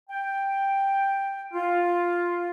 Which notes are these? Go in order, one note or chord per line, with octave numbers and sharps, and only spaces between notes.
G5
F4